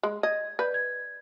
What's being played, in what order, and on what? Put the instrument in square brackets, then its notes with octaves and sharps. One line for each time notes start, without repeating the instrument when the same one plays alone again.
[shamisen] G#3
[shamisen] D#5 [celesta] G#6
[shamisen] B4 [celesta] D5 G6
[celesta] G#6